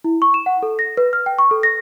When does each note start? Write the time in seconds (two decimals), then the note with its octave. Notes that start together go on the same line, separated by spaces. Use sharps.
0.04 E4
0.22 C#6
0.34 E7
0.46 F#5
0.63 A4
0.79 A#6
0.97 B4
1.13 F6
1.26 G5
1.39 C#6
1.51 A4
1.63 A#6